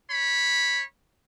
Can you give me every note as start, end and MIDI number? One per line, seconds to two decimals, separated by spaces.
0.11 0.84 73
0.11 0.84 83